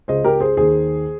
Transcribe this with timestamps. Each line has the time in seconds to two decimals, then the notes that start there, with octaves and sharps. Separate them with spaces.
0.08 C#2 C#3 C5 D#5
0.24 G4 A#4
0.41 G#4 C5
0.57 D#2 D#3 G#4 C5